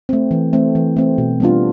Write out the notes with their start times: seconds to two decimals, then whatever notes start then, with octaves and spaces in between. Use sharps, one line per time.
0.09 A3 C4
0.31 E3
0.53 A3 C4
0.75 E3
0.97 A3 C4
1.18 B2
1.40 G3 B3 D4 F4